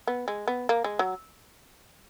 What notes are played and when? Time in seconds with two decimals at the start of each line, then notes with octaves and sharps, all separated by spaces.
0.08 B3
0.28 G#3
0.48 B3
0.69 A#3
0.84 G#3
0.99 F#3